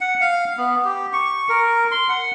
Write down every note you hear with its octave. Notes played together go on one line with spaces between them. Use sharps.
F#5
F5
B3
G4
C#6
A#4
C6
F#5